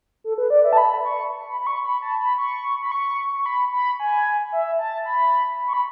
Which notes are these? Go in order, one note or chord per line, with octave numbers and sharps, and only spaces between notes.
A4
B4
D5
E5
A5
B5
C#6
B5
B5
C#6
B5
A5
B5
C#6
B5
C#6
C#6
B5
B5
G#5
E5
A5
B5
C#6
B5